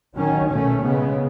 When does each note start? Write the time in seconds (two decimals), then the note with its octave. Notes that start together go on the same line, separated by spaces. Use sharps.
0.14 D#3 F#3 C#4
0.49 B2 A3 C#4
0.82 C#3 G#3 B3